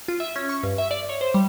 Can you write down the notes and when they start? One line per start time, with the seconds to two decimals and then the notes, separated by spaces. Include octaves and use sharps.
0.08 F4
0.20 E5
0.36 C#4
0.49 C#6
0.63 G2
0.78 E5
0.91 D5
1.09 C#5
1.21 C5
1.34 G3